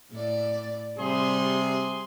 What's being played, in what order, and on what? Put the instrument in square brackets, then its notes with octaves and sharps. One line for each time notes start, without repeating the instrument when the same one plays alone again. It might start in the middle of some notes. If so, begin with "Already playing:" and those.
[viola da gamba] A2 D5
[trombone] C3 [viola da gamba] G3 [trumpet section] G#4 C6